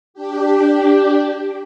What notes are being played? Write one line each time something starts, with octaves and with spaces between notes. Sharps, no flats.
D4 G4